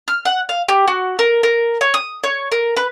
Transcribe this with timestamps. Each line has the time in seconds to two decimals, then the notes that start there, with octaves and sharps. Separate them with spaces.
0.08 F6
0.25 F#5
0.49 F5
0.68 G4
0.88 F#4
1.19 A#4
1.43 A#4
1.81 C#5
1.94 D#6
2.24 C#5
2.52 A#4
2.76 B4